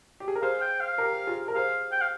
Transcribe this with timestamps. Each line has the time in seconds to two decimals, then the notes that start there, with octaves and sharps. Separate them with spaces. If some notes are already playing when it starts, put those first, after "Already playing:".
0.20 G4
0.28 G#4
0.35 A#4
0.42 G#4 C5 F5
0.61 G5
0.80 F5
0.98 G4 A#4
1.27 F4 G#4
1.48 A#4
1.55 G#4 C5 F5
1.92 G5
2.01 F5